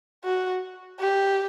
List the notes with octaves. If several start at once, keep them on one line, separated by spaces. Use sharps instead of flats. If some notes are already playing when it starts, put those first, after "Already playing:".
F#4
G4